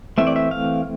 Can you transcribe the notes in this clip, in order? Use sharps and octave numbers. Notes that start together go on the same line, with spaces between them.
E3 A3 C4 E5
D5
E5
F5